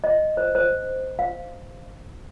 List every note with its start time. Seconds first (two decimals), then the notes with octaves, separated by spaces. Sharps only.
0.04 D#5
0.37 C5
0.55 C5
1.19 F5